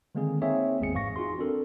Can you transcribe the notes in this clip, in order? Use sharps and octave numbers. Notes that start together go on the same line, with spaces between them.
D3 D#3 G#3 A#3 C4 G#4
A#3 C4 D#4 G#4 C#5 E5
G#1 E2 G#3 C4 G#4 C#7
F2 G#2 E3 F5 C#6 A#6
D#4 F4 F#4 G#4 C6
C4 D4 A4 A#4